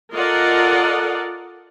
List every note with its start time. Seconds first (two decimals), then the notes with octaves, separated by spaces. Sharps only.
0.13 F4 A4 A#4 D5 D#5 F#5